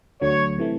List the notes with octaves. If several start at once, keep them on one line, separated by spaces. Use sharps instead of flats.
D2 D3 F#3 C#5
C3 E3 A3